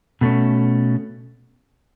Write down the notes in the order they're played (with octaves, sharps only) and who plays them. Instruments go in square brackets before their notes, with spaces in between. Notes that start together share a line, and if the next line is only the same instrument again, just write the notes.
[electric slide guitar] B2 A3 C#4